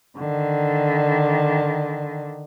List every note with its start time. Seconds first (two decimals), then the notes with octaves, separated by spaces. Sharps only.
0.18 D3 D#3